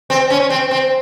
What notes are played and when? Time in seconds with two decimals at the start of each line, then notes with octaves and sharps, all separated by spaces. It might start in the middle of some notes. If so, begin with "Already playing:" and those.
0.10 C4
0.30 C#4
0.50 C4
0.71 C4